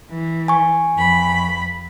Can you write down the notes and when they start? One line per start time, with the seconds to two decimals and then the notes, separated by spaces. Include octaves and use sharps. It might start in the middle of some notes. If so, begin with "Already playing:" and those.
0.11 E3
0.48 G#5 C#6
0.96 F2 B5